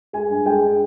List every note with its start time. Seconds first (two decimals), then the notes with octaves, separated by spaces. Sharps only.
0.13 G#3 G#5
0.29 G2
0.46 G#3 G5